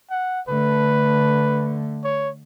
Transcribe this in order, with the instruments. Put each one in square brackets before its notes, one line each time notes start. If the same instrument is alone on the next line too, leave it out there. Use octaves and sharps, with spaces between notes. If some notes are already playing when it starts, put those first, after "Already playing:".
[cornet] F#5
[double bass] D3 A3 [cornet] B4
[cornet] C#5